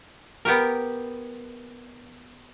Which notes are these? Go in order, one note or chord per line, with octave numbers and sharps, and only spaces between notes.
B3 G4 A#4